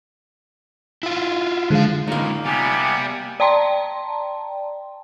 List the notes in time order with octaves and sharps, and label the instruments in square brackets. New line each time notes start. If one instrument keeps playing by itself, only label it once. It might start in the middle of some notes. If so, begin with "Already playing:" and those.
[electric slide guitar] E4 F4
[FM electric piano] D3 G#3 [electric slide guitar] F3 F5
[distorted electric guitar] C#2 A#2 [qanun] A#3 D#4
[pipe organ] C3 B3 [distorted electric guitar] G3 [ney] G#5
[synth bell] D5 G5 A5 A#5 C6